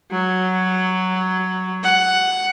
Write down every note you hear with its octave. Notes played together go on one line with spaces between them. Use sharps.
F#3
F#5